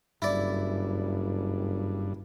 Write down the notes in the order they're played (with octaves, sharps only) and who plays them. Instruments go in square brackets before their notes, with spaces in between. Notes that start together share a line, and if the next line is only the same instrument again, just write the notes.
[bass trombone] F#1 [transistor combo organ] G2 [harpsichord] E4 D5